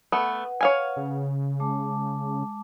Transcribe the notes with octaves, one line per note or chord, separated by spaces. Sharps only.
A3 B3 B4 F#5
C#5 F5 G#5
C#3
G#3 A5 D6